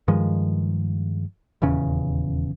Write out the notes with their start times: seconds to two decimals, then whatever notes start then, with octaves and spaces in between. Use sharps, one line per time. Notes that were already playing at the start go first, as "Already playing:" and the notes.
0.08 G2 D#3 F3 G#3
1.62 D#1 E2 C#3 C#4